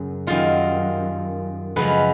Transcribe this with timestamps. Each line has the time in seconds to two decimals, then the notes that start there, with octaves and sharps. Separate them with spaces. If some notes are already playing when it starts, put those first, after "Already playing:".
Already playing: F#2 C#3
0.27 F#2 D#3 G3 F4
1.76 F#2 C#3 F3 G#3 B4